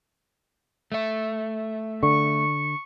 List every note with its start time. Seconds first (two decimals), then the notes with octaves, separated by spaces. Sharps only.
0.92 A3 E5
2.03 D3 C#6